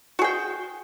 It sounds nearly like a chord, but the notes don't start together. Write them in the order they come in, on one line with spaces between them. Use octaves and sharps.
F#4 G#4 G5